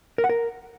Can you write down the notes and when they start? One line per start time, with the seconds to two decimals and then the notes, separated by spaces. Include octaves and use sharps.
0.18 A#4
0.24 F#5
0.29 A#4